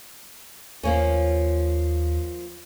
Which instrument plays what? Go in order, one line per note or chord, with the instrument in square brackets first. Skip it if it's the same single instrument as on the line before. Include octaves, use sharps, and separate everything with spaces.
[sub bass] D#2 [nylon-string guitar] F3 A#3 C#4